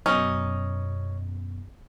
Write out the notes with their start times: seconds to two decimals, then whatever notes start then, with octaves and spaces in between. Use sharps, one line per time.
0.06 F#2 B2 C#4 D#4